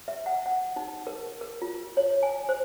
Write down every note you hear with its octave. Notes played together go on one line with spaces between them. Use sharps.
E5
F#5
F#5
D#4
A#4
A#4
F4
C#5
G#5
C5